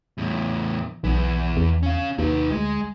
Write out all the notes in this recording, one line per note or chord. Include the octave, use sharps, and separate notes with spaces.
E2 A2
B1 E3 B3
E2
C#4 F5
D#2 D#4 B4
D2 G#3